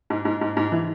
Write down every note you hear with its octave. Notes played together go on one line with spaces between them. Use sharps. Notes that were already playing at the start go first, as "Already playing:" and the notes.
G#2
G#2
G#2
G#2
E3